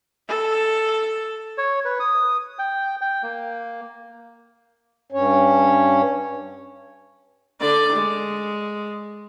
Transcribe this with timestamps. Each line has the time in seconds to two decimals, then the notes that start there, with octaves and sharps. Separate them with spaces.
0.28 A4
1.58 C#5
1.85 B4
2.00 D#6
2.59 G5
3.01 G5
3.23 A#3
5.12 G2 C#4 C#5
7.60 D3 D5
7.92 G#3